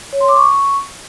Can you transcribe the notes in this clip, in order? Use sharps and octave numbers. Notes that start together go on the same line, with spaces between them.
C#5
C6
D6
C#6